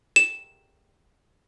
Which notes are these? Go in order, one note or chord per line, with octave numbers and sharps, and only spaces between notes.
E7